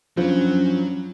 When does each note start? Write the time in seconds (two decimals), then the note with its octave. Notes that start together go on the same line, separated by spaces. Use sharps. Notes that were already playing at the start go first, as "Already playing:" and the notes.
0.17 G2 F3 F#3 C#4